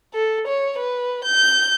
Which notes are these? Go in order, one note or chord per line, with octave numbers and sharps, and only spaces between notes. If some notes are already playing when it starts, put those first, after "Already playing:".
A4
C#5
B4
G6